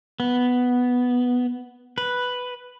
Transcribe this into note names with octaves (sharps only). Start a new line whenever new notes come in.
B3
B4